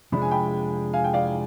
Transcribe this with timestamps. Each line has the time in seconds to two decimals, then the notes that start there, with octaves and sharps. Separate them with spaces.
0.12 F2 C3 F3 G#3 D4 B5
0.22 G#5
0.31 G5 B5
0.93 F5 G#5
1.04 G5
1.13 D5 F5